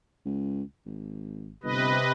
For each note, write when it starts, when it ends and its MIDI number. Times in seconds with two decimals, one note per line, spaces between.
0.25 0.63 37
0.86 1.54 32
1.63 1.98 31
1.63 2.12 48
1.63 2.12 71
1.63 2.12 75